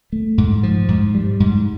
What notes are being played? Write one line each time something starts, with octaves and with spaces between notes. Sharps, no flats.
A3
G#2
F3
G#2
G3
G#2